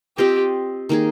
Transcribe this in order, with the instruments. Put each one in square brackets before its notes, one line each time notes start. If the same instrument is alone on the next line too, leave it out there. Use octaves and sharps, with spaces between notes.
[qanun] C4 F4 C5 D#5 [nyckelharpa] G4
[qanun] D#3 A#3 D#4 G#4